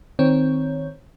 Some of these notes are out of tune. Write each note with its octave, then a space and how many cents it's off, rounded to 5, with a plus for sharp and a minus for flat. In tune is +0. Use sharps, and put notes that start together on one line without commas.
D#3 +0 C4 +0 C#5 +0